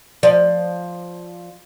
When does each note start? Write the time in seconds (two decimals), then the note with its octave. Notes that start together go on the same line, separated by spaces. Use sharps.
0.23 F3 D5